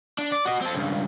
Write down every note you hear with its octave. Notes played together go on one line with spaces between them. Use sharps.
D4
D5
F#4 D#5
C4 A4
C#2 G2